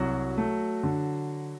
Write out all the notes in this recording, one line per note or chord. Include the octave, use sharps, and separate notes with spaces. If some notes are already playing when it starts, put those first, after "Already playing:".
Already playing: C2 F#3 F#4
A3
D3